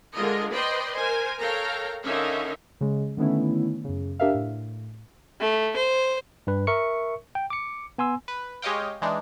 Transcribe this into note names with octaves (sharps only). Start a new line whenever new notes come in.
D3 G#3 F4 A#4 D#5
B4 C5 D5 D#5 G5 C6
A#4 C5 G#5
A4 A#4 C#5 F5 G5 A#5
D3 C#4 D#4 A#4 E5 F5
C#3 G#3
D3 D#3 A3 B3 C#4 E4
F#2 C#3
D4 G4 A#4 E5 F5
A2
A3
C5
G2 B4
A#4 E5 C#6 C#7
G5
D6 C#7
B3 G#5 C6 E6
B4
G#3 G4 C#5 D#5 F5 G5
E3 G#3 D4 D#4